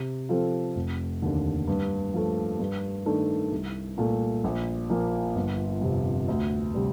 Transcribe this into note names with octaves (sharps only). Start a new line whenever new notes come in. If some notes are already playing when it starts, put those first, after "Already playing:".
Already playing: C3
F3 C4 F4 A4
F1
D#2 D3
G2
F3 A3
G2
D#3 A3 D4
C2
A#2 A3
A#1
A#2 F3 A#3
G1
F2 C3
D2
C3 G3